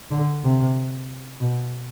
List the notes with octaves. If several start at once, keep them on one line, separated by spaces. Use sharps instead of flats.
D3
C3
B2